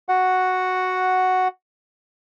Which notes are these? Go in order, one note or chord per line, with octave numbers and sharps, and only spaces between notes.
F#4 F#5